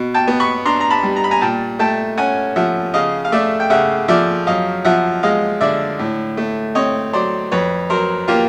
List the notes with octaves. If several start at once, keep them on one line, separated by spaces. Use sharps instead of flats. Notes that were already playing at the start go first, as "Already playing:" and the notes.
Already playing: B2
G5 A5
B3
B5 C#6
D4 A#5 C6
A#5
A5 B5
G3
A#5
B5
G#5 A#5
A#2 G5 A5
A3 G5 A5
C#4 F#5 G#5
F3 E5 F#5
C#3 D#5 F5
F5
A3 D5 E5
G5
C#3 E5 F#5
F3 D5 E5
F#2 D#5 F5
F3 E5 F#5
G#3 D#5 F5
D3 D5 E5
A2
A3
C4 C#5 D#5
F#3 C5 D5
F2 B4 C#5
F#3 A#4 C5
A#3 F4 G4